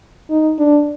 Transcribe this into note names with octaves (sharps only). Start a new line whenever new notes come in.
D#4
D4